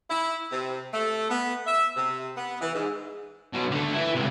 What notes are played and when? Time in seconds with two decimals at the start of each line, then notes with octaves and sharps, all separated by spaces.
0.10 E4
0.51 C3
0.92 A3
1.29 B3
1.67 E5
1.97 C3
2.37 B3
2.61 E3
2.74 G#2
3.53 B2 F#3
3.71 D3 A3
3.93 E4 B4
4.15 C#2 C3